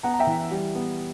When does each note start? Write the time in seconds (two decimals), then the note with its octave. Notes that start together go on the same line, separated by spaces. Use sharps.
0.03 B3 F#5 A#5
0.14 A#5
0.19 E5 G5
0.27 E3
0.51 G3
0.75 B3